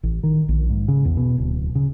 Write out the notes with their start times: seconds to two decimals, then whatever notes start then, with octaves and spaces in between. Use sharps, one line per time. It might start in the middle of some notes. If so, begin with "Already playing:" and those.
0.03 A1
0.23 D#3
0.48 A#1
0.70 G#2
0.88 C#3
1.05 E2
1.17 B2
1.38 D1
1.75 C#3